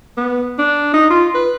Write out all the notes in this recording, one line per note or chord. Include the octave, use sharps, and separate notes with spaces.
B3
D4
D#4
F4
B4